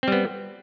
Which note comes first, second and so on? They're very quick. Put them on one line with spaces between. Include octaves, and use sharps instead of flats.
C4 G3 B3